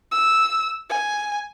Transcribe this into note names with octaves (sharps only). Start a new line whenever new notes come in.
E6
G#5